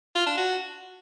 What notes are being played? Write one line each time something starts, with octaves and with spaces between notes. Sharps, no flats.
F4
D4
F#4